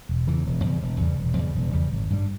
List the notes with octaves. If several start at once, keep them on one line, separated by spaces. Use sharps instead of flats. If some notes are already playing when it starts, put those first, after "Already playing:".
E1
E2 C#3 E3
E1
E2 C#3 G3
E1
E2 C#3 G3
E1
E2 C#3 G3
E1
E2 C#3 G3
G#1
G2 G3